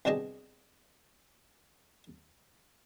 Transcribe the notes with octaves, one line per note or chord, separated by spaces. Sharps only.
C2 B2 D4 G4 G#4 D#5